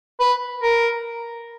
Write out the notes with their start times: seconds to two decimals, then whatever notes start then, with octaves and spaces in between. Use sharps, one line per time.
0.20 B4
0.63 A#4